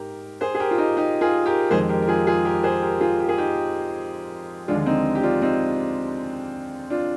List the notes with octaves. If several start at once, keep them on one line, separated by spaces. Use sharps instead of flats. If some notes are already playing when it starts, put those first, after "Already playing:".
Already playing: G#2 G4 A#4
G#4 C5
G#4
G4 A#4
F4
D#4 G4
D#4 G4
F4 G#4
G4 A#4
F2 D#3 G#3 G#4 C5
G4 A#4
A#4
F4 G#4
F4 G#4
G4 A#4
G#4 C5
G4 A#4
F4 G#4
G4
G#4
D#4 G4
D#2 D3 F3 G#3 D4 F4
C4 D#4
G4
D4 F4
C4 D#4
D4 F4